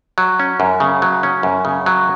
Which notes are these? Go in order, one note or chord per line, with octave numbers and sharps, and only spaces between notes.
F#3
C#4
F#2
C#3
F#3
C#4
F#2
C#3
F#3